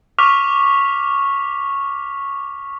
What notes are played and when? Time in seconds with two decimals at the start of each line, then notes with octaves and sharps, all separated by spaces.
0.19 C#6 D6 F6 B6 F7